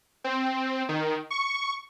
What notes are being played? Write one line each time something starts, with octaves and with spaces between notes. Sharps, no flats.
C4
D#3
C#6